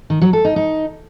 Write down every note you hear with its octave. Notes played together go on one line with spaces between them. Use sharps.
D#3
F#3
A4
D#4
D#4